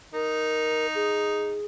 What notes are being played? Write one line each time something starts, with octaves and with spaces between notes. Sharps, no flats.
D#4 A#4
G#4